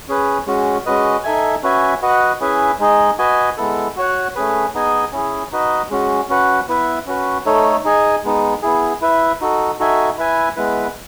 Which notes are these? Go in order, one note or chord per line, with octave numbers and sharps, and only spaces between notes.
C#4 G#4 B4
G#3 C#4 F#4
G#3 C#4 F#4 B4 D#5
D#4 A4 E5 G#5
C#4 F#4 B4 E5 G#5
F#4 B4 D#5 F#5
C#4 E4 G#4 B4 E5
G#3 D#4 G#4 D#5
F#4 B4 D#5 G#5
G#3 B3 E4 A4
F#4 C#5 F#5
A3 C#4 G#4 B4
B3 D#4 G#4 D#5 G#5
C#4 E4 G#4
D#4 F#4 B4 D#5
G#3 C#4 F#4
C#4 F#4 B4 F#5
B3 E4 B4 E5
C#4 F#4 B4
A3 D#4 A4 C#5
D#4 G#4 D#5 G#5
G#3 B3 D#4
B3 E4 G#4
E4 B4 E5
D#4 F#4 A4
D#4 F#4 A4 E5 G#5
E4 B4 E5 G#5
G#3 B3 E4 B4